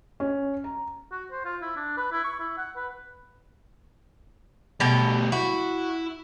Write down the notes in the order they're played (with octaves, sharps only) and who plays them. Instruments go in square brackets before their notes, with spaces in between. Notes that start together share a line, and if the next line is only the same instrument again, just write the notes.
[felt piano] C#4
A#5
[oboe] F#4
C5
F4
E4
D4
B4
E4
C#6
E4
F#5
B4
[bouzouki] B2 G4 [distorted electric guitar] G3 A3
[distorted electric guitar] E4 [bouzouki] F#4